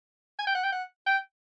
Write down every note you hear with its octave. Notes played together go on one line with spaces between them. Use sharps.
G#5
G5
F#5
G5
F#5
G5